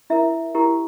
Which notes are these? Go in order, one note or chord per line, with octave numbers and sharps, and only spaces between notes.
E4 A#4 E5
E4 G4 A#4